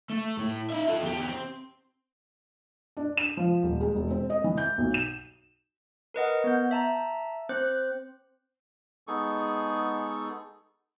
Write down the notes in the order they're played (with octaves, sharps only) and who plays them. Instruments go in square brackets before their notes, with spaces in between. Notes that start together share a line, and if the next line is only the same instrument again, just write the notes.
[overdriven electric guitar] A3
A2
D#4 E5
F4 A4
E2 G4
C4
[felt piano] D4
E7
F3
D#1
G#3
E1
C4
D#5
E3
G6
B1
E7
[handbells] A#4 B4 D#5 F#5
B3 G6
E5 A5 A#5
C4 C5 F#6
[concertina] G#3 B3 D#4 G#4 A4 C#6